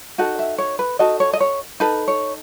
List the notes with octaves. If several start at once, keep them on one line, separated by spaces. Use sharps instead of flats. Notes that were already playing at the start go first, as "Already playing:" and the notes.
D#4 F#4 A4 F#5
E5
C#5
B4
D#4 F#4 A4 D#5
C#5
D#5
C#5
D#4 A4 B4
C#5